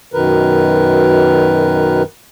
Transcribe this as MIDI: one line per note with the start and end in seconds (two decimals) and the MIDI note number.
0.14 2.03 42
0.14 2.03 47
0.14 2.03 51
0.14 2.03 70
0.14 2.03 71